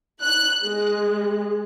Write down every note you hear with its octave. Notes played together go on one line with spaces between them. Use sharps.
F#6
G#3